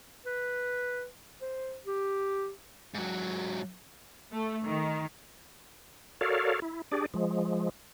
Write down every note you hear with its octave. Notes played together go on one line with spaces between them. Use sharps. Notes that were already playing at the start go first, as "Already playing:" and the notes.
B4
C5
G4
G#2 F#3
A3
D#3
F#4 A4 A#4 C#5 D5 F5
E4
D4 G4 G#4 D5
F3 G#3